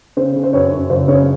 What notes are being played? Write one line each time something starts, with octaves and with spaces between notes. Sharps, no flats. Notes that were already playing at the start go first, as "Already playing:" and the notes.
C#3 C5
C#3
C5
F#2 B4 C#5
F#2
F#1 C5
C#3 B4 C#5